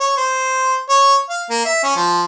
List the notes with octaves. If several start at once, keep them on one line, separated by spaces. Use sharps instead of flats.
C#5
C5
C#5
F5
A#3
E5
C#4
F3